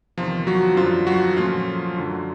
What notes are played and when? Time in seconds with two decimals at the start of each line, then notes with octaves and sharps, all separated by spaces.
0.18 E2 C3 D#3 F3 F4
0.47 F#3 F#4
0.76 F#2 D3 F3 G3 F4
1.07 F#3 F#4
1.37 A#2 F3 F#3 A3 C#4 F4
1.96 F#2 D3 F#3